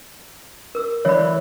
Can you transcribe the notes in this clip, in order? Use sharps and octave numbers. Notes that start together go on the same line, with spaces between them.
A#4 E6
E3 C#5 D5 B5